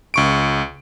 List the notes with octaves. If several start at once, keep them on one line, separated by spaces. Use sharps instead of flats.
C#2 C#6 D7